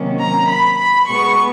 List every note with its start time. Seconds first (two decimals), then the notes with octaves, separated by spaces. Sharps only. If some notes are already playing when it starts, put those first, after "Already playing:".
Already playing: C3 D#3 F#3 A#3 C#4
0.20 A#5
0.49 B5
0.79 B5
1.09 B2 G#3 B3 C#6